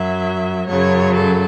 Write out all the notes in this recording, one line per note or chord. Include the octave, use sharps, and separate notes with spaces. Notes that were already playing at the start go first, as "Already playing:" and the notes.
Already playing: F#2 F#3 E5
F#2 C#3 F#3 C#5
A4